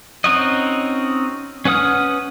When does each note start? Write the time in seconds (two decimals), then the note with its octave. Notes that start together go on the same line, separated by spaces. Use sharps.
0.24 C4 C#4 D#4 F#4 D#5
1.65 C#4 B4 F#5 D#6 F6